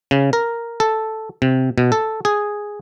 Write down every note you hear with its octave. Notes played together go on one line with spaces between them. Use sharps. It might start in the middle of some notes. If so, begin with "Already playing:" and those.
C#3
A#4
A4
C3
B2
A4
G#4